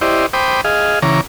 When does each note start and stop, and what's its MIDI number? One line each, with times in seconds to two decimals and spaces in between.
0.01 0.26 64
0.01 0.26 67
0.01 0.26 72
0.01 0.26 74
0.01 0.26 75
0.33 0.61 72
0.33 0.61 79
0.33 0.61 83
0.33 0.61 86
0.33 0.61 87
0.65 0.99 68
0.65 0.99 75
0.65 0.99 77
1.02 1.21 49
1.02 1.21 52
1.02 1.21 73
1.02 1.21 82
1.02 1.21 86